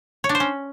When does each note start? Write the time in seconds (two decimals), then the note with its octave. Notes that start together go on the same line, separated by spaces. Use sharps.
0.24 C#5
0.29 D4
0.35 C5
0.40 C#4